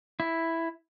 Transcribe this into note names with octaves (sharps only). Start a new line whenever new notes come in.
E4